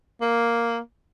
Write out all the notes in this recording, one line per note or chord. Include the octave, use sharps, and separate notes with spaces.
A#3